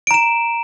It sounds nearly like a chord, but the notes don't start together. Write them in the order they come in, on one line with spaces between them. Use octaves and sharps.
D7 A#5 E7